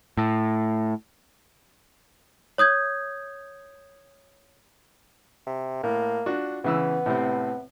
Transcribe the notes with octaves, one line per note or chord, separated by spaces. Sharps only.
A2
C#5 D#6 G6 G#6
C3
A2 A#3
D4 F4 F#4
C#3 E3 B3 E6
A2 C3 C4